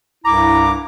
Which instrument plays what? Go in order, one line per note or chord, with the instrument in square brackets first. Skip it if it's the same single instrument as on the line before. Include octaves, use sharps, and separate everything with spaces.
[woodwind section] C2 G2 E4 A#5 D6